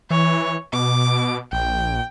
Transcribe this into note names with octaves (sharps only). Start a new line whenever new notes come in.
E3 C#5
B2 D6
A#1 G5